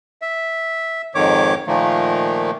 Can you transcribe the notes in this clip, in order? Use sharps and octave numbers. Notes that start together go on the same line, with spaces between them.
E5
F2 G#2 D#3 C#5 D6
A#2 D#3 F3 A3 A#3